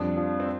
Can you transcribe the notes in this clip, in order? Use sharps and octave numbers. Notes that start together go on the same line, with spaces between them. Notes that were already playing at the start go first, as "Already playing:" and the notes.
Already playing: F2 G3 D4
F3
C4